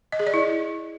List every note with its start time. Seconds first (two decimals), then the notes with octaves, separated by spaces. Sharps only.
0.12 D#5
0.20 G#4
0.27 D5
0.34 E4